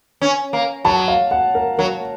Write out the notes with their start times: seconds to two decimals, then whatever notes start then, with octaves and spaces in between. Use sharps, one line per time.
0.22 C#4
0.53 A#3
0.85 F#3 A5
1.08 F5
1.31 F#5
1.55 A#4
1.78 F#3 A#4